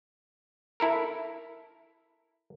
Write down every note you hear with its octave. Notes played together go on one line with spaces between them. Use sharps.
E4 A4 A#4